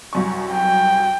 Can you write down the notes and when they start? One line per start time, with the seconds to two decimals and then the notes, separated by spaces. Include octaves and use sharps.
0.13 C2 F#2 C#6
0.52 G5